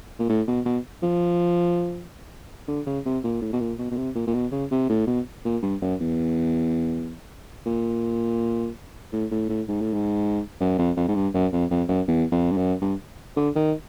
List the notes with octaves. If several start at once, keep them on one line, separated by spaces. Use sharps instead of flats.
A#2
A2
B2
B2
F3
D3
C#3
C3
A#2
A2
B2
A#2
B2
B2
C3
A#2
A#2
B2
C#3
C3
A2
B2
A#2
G2
F#2
E2
A#2
A2
A2
A2
G#2
A2
G#2
F#2
F2
F2
G#2
G2
F#2
F2
F2
F#2
E2
F2
G2
F#2
G2
D3
D#3